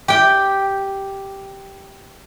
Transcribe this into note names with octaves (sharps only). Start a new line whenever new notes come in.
G4 G5